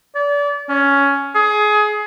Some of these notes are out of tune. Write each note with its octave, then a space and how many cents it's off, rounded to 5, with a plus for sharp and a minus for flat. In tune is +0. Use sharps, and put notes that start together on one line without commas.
D5 -30
C#4 +10
G#4 +20